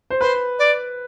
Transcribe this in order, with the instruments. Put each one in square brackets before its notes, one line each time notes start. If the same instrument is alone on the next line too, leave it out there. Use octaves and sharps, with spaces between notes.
[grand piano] C5
[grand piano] B4 [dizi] C5
[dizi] D5